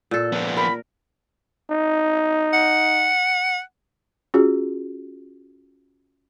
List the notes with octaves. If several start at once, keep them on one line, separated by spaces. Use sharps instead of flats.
A#2 A4
F3 B3
A#4 B5
D#4
F#5
C#4 F4 F#4 G#4